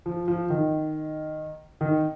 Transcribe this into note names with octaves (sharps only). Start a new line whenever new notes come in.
F3
F3
D#3
D#3